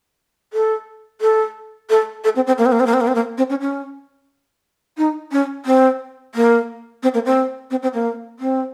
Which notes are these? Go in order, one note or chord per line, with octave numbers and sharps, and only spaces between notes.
A4
A4
A4
A4
C4
C4
A#3
C4
A#3
C4
A#3
C4
A#3
C4
A#3
C4
C#4
C#4
D#4
C#4
C4
A#3
C4
A#3
C4
C4
C4
A#3
C4